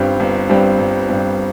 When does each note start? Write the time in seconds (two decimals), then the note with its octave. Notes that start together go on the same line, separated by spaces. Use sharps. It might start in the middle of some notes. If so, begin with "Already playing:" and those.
Already playing: G1 G2 G3 C4
0.19 G1
0.49 G2 G3 C4
0.79 G1
1.09 G2 G3 C4